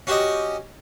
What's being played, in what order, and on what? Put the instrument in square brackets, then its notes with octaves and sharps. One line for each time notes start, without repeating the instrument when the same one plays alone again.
[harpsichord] C#4 F#4 G4 D#5